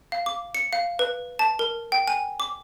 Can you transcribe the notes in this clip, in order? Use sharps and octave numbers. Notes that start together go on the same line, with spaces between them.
F5
D6
C#7
F5
B4
A5
A#4
G5
G#5
D6